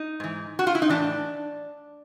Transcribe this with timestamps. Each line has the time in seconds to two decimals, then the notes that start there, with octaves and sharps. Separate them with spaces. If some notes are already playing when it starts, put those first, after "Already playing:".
Already playing: D#4
0.20 G#2 E3
0.59 F#4
0.67 F4
0.75 E4
0.82 D#4
0.89 A2 E3 D4